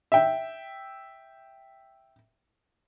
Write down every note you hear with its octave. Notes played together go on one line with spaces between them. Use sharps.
E5 G5